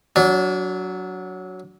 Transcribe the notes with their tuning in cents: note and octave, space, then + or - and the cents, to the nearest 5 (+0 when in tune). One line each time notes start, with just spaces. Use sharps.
F#3 +0 D4 -30